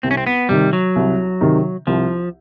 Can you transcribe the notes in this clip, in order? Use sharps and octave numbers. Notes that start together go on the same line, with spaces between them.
C2 C4
C#4
C4
B3
C3 D#3 G3
F#3
C2
C3 D#3
C2 F3